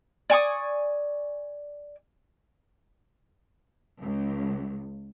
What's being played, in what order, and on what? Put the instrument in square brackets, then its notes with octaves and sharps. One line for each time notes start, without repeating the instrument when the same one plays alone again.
[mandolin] D5 G#5 C#6 D#6
[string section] C#2